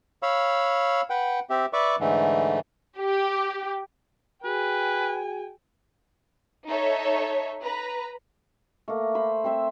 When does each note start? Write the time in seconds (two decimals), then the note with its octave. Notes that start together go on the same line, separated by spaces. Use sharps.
0.23 C#5 F5 B5 E6
1.10 B4 F#5 G5
1.50 C4 G4 E5
1.73 B4 D5 E5 C#6 D6
2.00 G#2 D3 E3 A3
2.97 G4
4.44 F#4 G#4 B4 G5 G#5
6.68 D#4 A4 C#5 E5
7.62 B4 A#5
8.88 A3 A#3
9.15 C5 B5
9.44 C4 C5 E5